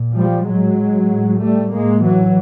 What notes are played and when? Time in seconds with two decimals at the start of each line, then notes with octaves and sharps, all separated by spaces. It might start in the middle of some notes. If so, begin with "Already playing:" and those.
Already playing: A#2
0.14 F3 G3
0.45 A2 F#3 G#3
1.09 A2
1.40 G3 A3
1.71 A2 G#3 A#3
2.03 E3 F#3